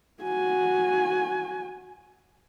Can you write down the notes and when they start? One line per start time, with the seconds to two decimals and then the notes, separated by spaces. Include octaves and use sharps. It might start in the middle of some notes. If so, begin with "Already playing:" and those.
0.23 F#4 G#5